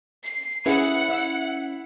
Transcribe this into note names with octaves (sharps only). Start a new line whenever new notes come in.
C7
C#4 E4 G#4 B4 F#5
E5 E6